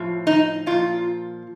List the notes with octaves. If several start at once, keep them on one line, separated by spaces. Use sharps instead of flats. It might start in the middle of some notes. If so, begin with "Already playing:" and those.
Already playing: A2 F3
D#4
A#2 F3 F4